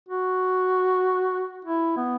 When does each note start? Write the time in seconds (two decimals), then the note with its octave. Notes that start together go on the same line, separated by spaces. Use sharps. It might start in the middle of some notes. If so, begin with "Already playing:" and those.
0.08 F#4
1.65 E4
1.97 B3